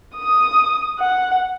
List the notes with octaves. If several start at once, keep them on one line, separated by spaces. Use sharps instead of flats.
D#6
F#5